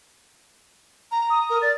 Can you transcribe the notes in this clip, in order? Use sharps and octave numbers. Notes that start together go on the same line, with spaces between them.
A#5
D#6
A#4
D5 A6